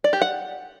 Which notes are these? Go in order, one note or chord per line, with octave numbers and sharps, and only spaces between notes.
D5
G4
F#5